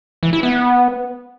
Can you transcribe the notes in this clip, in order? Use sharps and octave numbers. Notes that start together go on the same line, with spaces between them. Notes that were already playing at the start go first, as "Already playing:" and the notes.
E3
E4
B3